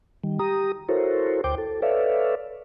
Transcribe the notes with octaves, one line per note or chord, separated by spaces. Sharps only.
D#3 G3
G4 A#5 D#6
E4 F#4 A4 A#4 C5 C#5
D2 C5 G5 D6
A4
A4 B4 C#5 D5 E5 F5